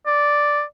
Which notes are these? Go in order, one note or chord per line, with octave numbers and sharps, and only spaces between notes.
D5